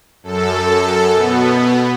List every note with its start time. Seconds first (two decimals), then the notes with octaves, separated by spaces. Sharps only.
0.23 F#2 A4
1.14 B2 B3